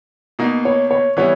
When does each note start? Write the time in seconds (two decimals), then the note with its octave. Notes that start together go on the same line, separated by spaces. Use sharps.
0.39 B2 A#3 D#4
0.65 C#5
0.91 C#5
1.17 E3 G3 B3 E4 C#5